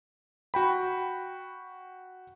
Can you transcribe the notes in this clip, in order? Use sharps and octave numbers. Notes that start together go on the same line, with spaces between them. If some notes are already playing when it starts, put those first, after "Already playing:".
F#4 G5 B5